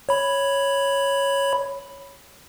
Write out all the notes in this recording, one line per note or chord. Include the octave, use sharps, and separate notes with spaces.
C#5 B5